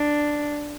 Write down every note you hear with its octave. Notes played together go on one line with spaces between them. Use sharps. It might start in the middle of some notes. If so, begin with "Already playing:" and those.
Already playing: D4